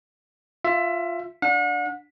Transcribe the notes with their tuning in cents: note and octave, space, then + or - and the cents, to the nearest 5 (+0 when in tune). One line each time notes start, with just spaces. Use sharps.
F4 +0 E5 +20
D4 +0 F#5 -40